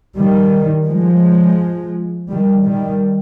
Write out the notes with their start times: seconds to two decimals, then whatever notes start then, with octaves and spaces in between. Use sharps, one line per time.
0.17 D#3 G3
0.87 F3 G#3
2.30 D#3 G3
2.65 D#3 G3